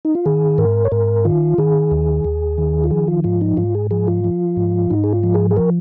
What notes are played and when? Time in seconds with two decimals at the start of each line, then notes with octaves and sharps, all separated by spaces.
0.05 D#4
0.15 F4
0.26 D#3 G#4
0.58 G#2 A#4
0.85 C#5
0.92 G#2 A#4
1.25 D#3 F4
1.58 D#3 G#4
1.91 D#2
2.25 D#2
2.58 D#3
2.84 F4
2.91 F3 G#4
3.08 F4
3.24 G#2 F4
3.41 D#4
3.57 G#2 F4
3.75 G#4
3.91 F3 G#4
4.07 F4
4.24 F3
4.57 G#2
4.90 G#2 D#4
5.04 G#4
5.13 F4
5.23 F3
5.34 G#4
5.51 G#4
5.56 F3 A#4